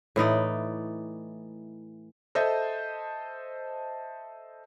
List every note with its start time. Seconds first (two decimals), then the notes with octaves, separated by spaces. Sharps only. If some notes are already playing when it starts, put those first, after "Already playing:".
0.16 A2 E3 D#4 D5
2.35 A4 C5 D#5 E5 A5